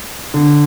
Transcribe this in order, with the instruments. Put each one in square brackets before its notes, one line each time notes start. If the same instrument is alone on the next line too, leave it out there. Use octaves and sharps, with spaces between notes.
[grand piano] D3